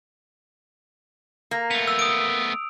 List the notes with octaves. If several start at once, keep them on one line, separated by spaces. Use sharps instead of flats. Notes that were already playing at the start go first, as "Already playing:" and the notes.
A#3
A3 B3 F7
E6
D#6 D7